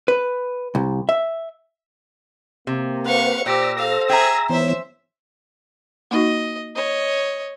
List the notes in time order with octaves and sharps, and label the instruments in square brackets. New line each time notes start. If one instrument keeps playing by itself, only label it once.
[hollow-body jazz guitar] B4
C2
E5
[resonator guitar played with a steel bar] C3 [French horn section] A#3 C4
[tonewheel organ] B4 C5 F#5 [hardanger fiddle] F5 C#6
[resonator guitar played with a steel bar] A#2 [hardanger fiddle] G4 [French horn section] C5 D5 [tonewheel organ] E6 A#6
[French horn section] A4 C5 [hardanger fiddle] F5
[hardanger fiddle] G#4 E5 [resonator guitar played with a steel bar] G5 A#5
[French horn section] G#2 C#5 [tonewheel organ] E3 B3 [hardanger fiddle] C5 E5
[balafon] A#3 D#4 F#4 [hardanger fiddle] D#5
[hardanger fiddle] C#5 D#5